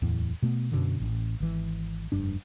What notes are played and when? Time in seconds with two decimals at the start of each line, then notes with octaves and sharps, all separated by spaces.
0.02 D1 E2 A2
0.42 B2 A3 B3
0.72 F#2 B2 D3
1.00 A1
1.40 G#1 E3
2.12 F1 G2 D4